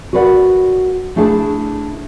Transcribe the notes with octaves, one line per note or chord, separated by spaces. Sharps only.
F#4 A#4 B4 D5 F#5
A3 D4 E4 G#4 G5 A5